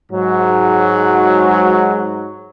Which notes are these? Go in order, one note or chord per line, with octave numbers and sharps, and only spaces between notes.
G#2 F#3